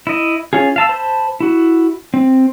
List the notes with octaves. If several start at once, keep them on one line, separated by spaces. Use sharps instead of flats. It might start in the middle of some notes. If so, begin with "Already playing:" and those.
E4 D#5
C#4 F4 G#4
F5 A5 E6
C5 A5 B5
E4 F#4
C4